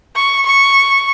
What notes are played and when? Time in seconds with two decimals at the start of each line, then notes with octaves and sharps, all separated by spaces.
0.16 C#6
0.46 C#6